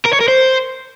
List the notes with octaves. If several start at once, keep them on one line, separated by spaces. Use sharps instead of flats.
A#4
C#5
A#4
C5